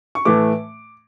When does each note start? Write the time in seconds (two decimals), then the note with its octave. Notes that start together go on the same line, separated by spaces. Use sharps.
0.15 C#6
0.25 A2 E3 A3 D6